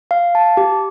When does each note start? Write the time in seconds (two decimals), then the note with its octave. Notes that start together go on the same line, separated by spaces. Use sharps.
0.11 F5
0.35 A5
0.57 G4